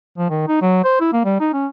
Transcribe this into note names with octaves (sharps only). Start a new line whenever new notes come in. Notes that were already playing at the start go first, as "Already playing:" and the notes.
F3
D#3
D#4
F#3
C5
E4
A#3
G3
D#4
C#4